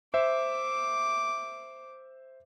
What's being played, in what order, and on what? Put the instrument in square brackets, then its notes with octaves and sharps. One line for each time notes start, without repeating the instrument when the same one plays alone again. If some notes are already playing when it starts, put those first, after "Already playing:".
[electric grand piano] C5 E5 [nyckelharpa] D6